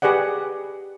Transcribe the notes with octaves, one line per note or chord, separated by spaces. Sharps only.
G4 G#4 B4 D5 F#5